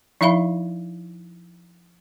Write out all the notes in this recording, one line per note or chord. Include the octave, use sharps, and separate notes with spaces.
F3 D#4 E4 E5 F5 B5